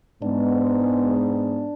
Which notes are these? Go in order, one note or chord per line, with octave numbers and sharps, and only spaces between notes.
G#2 G#3 B3 D4